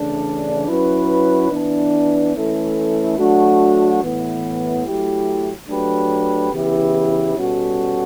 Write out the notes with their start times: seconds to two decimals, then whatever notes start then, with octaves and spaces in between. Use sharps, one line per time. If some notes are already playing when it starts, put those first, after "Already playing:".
Already playing: C#3 E3 A3 D4
0.68 F#3 C#4 E4 B4
1.51 E3 B3 D4
2.35 E3 A3 C#4 E4 A4
3.18 F#3 A3 D4 F#4
4.02 A2 E3 B3
4.85 F#3 A3 E4 G4
5.68 F#3 A3 D4 G4 B4
6.51 C#3 E3 B3 E4 G4
7.35 B2 G3 C#4 F#4 A4